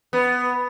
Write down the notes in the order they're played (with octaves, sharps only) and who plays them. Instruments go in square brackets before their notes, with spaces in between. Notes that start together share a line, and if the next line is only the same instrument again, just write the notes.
[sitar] B3